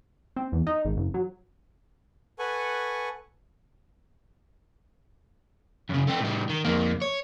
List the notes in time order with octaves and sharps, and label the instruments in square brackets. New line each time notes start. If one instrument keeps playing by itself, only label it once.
[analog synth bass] C4
E2
D#4
G#1
F#1
F#3
[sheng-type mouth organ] A4 B4 F#5 G#5 C#6
[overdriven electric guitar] F#2 C#3
A3 C4
A2 G3
D#3
F2 A#3
C#5